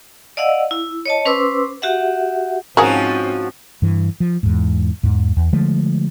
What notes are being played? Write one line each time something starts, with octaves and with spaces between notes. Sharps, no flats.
D5 D#5 F5 F#5 E6
E4
C#5 D#5 A5
C#4 B4 C5 C6 D6 E6
F#4 G4 E5 F#5
G#2 F3 G#3 C4 C#4 F#4 G#4 A#4
G2 E3
F3
E2 G#2
E2 G#2
E2
D3 F3 G#3 A3